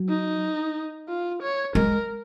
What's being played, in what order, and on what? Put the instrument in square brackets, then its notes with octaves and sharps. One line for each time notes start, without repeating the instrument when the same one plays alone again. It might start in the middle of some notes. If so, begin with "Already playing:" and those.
Already playing: [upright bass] F#3
[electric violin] D#4
F4
C#5
[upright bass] G#3 [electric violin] A#4